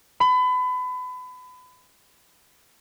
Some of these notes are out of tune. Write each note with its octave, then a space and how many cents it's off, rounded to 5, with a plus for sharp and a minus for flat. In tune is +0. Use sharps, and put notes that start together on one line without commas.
B5 +30